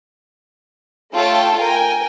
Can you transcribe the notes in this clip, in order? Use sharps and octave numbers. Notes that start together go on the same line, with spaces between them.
A3 F4 A4 C#5 G5
A#4 G5 G#5